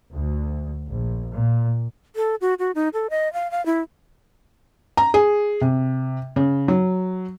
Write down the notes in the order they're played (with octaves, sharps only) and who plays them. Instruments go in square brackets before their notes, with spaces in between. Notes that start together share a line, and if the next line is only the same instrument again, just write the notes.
[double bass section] D2
A#1
A#2
[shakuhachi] A4
F#4
F#4
D#4
A4
D#5
F5
F5
E4
[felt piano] A#5
G#4
C3
C#3
F#3